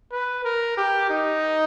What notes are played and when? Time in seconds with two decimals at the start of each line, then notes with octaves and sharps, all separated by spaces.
0.12 B4
0.45 A#4
0.77 G4
1.10 D#4